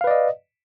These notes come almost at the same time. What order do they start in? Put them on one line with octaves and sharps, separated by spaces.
F5 B4 D5 D#5